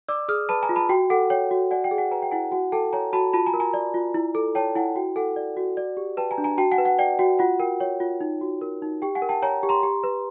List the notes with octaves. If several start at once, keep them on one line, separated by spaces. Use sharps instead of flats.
D5 D6 E6
G#4 D#6 F6
B4 A5 B5
G#5 A#5
F4
A5 B5
F#4 G5
A4 F#5
C#5 G5
F#4
D5 F#5 G#5
G5
G#4
F#5 G#5
B4 G#5 A#5
G5
E4 F#5 G#5
F#4 F#5 G#5
A4 G5 A5
C#5 G#5 A#5
F#4 A5 B5
F4 A5 B5
G#5 A#5
A#4
G#5 A#5
D5
F4
E4
A4
C#5 G5 A5
E4 F#5 G#5
F#4 G5
A4 F#5 G#5
D5
F#4
D5
G4
B4 G5 A5
G#5 A#5
D4
G#5 A#5
F#4 G5 A5
F#5 G#5
B4
F#5
D5 G5
F#4 G5
F4 F#5
A#4 G5
C#5 G5
F4
D#4
F#4
A#4
D#4
G4 G5
F#5 G#5
A#4
G5 A5
C#5 G#5 A#5
G4
A#5 C6
G4
B4